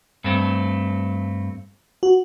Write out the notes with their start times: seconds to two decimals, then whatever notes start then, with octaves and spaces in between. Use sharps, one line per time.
0.24 G2 A3 C4
2.03 F#4